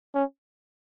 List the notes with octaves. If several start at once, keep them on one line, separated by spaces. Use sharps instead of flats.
C#4